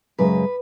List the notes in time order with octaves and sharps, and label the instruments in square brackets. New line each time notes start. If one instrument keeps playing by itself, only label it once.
[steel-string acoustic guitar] F#2 C#3 G#3 B4